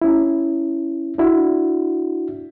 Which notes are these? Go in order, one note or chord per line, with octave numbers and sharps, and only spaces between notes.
C#4 E4
D4 E4 F#4